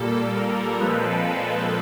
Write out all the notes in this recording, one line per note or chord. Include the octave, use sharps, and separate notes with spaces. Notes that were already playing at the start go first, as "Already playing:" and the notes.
Already playing: A#2 G3 A#3 A4
A#4
A#2 F3 G#3 C4 A4 B4